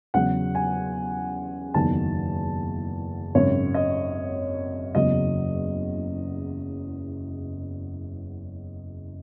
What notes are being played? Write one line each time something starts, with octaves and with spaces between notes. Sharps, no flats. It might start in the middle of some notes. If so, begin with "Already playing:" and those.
E2 C#3 F#3 F#5
G#5
F#1 E2 D#3 F#3 A5
G#1 F#2 C#3 C#5
D#5
F#1 E2 C#3 F#3 D#5